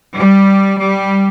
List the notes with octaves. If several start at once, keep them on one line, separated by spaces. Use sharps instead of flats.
G3
G3